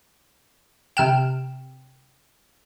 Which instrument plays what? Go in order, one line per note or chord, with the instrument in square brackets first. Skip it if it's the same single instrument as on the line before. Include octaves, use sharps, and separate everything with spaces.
[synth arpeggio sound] C3 F6 E7 [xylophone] G5